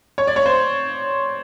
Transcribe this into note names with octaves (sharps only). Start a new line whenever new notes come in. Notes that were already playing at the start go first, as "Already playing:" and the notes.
C#5
D5
C#5
C5